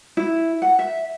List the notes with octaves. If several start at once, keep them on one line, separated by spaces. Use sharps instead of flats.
E4
F#5
E5